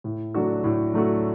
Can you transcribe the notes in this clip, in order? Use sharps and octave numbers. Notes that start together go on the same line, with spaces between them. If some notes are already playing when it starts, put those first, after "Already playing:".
A2
F#3 A3 D4 F#4
A2
F#3 A3 D4 F#4